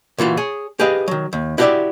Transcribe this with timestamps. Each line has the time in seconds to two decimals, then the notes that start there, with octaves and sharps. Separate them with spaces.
0.18 A#2 E3 F4 F#4
0.37 G#4 C#5
0.79 G4 G#4 B4 D#5 F5
1.08 D#3 F#3
1.33 D#2
1.58 E4 F#4 G4 A4 D5 E5